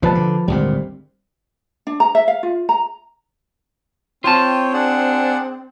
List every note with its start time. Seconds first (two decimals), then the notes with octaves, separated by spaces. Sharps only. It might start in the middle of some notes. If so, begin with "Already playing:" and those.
0.02 E1 D#2 C3 F3 B4 A5
0.15 D3
0.48 G#1 D2 A#2 G3 C4
1.87 D4
2.00 A#5
2.15 E5
2.28 F5
2.43 F4
2.69 A#5
4.24 C4 F4 C#5 G5 A5
4.73 D4 G#4 F#5